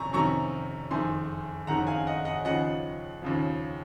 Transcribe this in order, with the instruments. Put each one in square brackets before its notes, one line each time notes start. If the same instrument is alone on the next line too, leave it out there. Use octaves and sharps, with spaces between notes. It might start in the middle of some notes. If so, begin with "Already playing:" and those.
Already playing: [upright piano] F2 C3 G#5 A#5 C#6
F2 C3 D#3 F#3 A#5 C#6
F#1 F2 D#3 G#5 C6
F#1 F2 D#3 F#5 A#5
F5 G#5
D#5 F#5
D#5 F#5
D#2 C#3 F3 D#5 F#5
D#2 C#3 F3